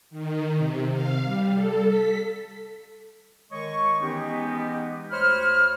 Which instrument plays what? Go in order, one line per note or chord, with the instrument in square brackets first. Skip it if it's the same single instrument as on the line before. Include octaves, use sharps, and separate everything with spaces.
[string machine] D#3
C3
F5
G3
A4
B6
[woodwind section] D#3 G#3 C#5 D#5 C#6
E3 G#3 B3 C#4 D#4 G4
D2 C5 C#5 B5 F6